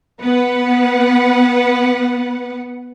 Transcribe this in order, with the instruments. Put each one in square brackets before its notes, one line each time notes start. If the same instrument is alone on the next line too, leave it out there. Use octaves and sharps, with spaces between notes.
[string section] B3 B4 F#5